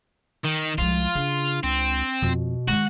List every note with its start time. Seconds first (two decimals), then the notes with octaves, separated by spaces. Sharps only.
0.45 D#3
0.78 C2 F3 G#3 F4
1.15 C#3 D4
1.63 C#2 C4
2.22 F2 B2
2.68 D#3 G#3 F#4